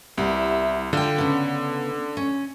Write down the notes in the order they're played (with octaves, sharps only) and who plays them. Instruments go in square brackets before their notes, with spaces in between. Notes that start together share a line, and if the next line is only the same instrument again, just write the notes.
[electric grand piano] C2 [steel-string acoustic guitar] G3 B3 E4
[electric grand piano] D3 [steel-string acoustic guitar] F4 G5
[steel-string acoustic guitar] C#3 B3
C#4